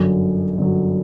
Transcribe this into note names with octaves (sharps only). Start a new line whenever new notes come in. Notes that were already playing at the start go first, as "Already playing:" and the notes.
Already playing: G1 F#2 F#3
G1 F#2 F#3